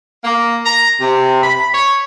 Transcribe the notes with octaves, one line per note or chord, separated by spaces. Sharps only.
A#3
A#5
C3
B5
C#5